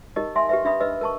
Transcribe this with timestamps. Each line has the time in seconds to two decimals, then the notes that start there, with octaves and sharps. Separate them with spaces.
0.16 D#4 G4 A#4 D#5
0.36 E5 G#5 C6
0.49 G4 B4 E5
0.65 D4 E5 B5 D#6
0.80 B4 D#5 E6
1.01 A#4 A5 C#6